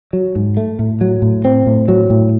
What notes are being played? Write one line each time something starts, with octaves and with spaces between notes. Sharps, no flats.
F#3
G#2
A3
A2
F#3
A2
C4
A2
F#3
A2